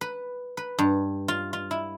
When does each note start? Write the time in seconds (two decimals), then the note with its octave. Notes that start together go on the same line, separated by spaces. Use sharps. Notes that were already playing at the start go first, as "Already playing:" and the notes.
0.01 B4
0.57 B4
0.79 G2
1.28 F4
1.53 F4
1.71 E4